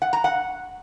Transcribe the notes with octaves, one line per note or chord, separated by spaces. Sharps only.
F#5
A#5
F#5